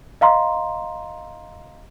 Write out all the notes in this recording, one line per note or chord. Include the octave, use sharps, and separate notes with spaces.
D#5 F5 A#5 C6